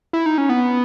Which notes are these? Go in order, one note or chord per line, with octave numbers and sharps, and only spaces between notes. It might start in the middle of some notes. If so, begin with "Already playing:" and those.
E4
D#4
C#4
B3